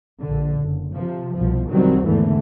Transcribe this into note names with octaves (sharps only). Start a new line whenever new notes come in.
A#1 D3
F#1
C3 F3
C2 B2 F3
C2 D#3 F#3 G3 C4
G#1 E2 D3 E3 A3